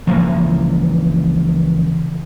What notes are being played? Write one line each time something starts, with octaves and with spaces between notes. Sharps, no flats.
C#2 E3 F3 A#3